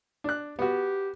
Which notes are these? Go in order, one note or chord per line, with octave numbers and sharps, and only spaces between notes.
D4 F#6
B3 F#4 G4